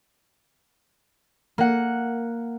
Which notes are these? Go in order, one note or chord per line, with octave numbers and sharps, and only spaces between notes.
A#3 F#5